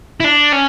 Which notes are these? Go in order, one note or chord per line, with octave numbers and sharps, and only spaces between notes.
E4
D4
C#4